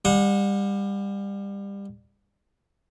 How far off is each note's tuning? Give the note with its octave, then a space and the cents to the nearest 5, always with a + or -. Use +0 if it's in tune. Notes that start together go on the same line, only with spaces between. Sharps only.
G3 +25 F#5 -30